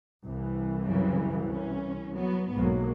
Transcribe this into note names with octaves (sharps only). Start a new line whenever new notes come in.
C2 E3
F#2 C#3 F#3
C#4
F#3 B3
B1 G#2 F#3 A#3